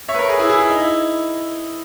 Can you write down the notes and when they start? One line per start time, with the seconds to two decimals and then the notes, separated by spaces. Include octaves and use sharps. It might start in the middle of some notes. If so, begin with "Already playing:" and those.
0.09 C#5 E5
0.14 B4
0.19 A#4 C#5
0.29 G#4 B4
0.39 E4 G#4
0.49 E4 G#4
0.60 E4
0.70 D#4
0.80 E4